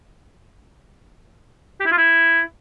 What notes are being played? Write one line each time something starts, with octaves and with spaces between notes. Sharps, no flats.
G4
E4
F4
E4